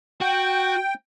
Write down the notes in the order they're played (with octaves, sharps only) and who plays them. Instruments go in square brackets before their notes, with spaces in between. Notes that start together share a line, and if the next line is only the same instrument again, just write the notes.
[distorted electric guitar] F#4 [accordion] G5